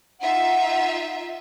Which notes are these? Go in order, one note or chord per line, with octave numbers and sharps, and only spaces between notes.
D#4 F4 E5 F#5